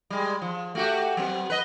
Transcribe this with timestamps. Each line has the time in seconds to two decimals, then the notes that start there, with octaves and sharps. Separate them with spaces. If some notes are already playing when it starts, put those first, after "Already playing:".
0.10 G3 G#3
0.42 F3
0.75 A3 F#4 G4
1.17 F#3 B3 C4
1.50 B4 D#5